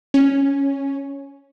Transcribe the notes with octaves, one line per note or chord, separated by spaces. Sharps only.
C#4